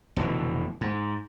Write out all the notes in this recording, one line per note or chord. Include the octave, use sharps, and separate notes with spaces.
F1 B2 D3 E3
G#2